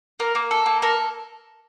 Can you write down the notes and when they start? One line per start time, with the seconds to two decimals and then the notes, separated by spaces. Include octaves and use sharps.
0.20 A#3 A#4
0.35 A#3
0.51 A4
0.66 A#3
0.82 A4 A#4